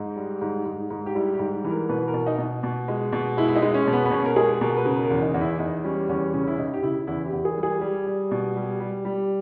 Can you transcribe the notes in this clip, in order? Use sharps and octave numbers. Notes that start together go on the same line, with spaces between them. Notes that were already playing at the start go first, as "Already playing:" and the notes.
Already playing: G#2 D#4
G3
G#2
G#2
G#2
G4
G3 E4
G4
G#2
E3
A#4
B2 B4
A#4
B2
D#4
B2
B2
G#3
B2
G#3 E4
E4
D#4
G#3
C#4
B2
B3
B3
B2 C#4
A#4
G#3 G#4
B2 A#4
B4
C#3 A#4
A#4
E2
D#4
E2
E4
E2 D#4
G3 C#4
E2 C#4
C#3 C#4
E4
C#3 D#4
G4
C#3 E4
E2 E4
G4
E2
G#4
G3
G#4
G3
G3
B2
G3
G3
G3